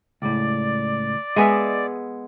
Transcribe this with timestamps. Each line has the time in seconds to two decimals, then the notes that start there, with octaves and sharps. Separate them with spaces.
0.22 C#2 A2 D5
1.36 G#3 B3 D#5 E5 G#5